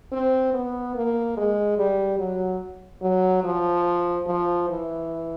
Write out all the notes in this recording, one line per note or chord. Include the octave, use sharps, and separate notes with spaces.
C4
B3
A#3
G#3
G3
F#3
F#3
F3
F3
E3